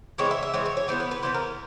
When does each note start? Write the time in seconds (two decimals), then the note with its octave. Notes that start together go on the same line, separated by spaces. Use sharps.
0.18 E3 G#3 C4 C#5
0.31 E5
0.43 E5
0.53 E3 G#3 C4 C#5
0.66 C#5
0.77 C#5
0.88 E3 G#3 B3 C5
1.00 B4
1.11 B4
1.23 E3 G#3 B3 C5
1.34 A#4